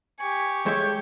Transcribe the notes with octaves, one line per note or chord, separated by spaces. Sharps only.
G4 G#5 C#6
G#3 A4 C#5 E5 G6